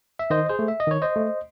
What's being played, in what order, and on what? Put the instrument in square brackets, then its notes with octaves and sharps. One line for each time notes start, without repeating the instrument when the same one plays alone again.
[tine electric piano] E5
D#3 C5 D#5
G#4 C5
A3
E5
D#5
D#3 C#5
C5 D#5
A3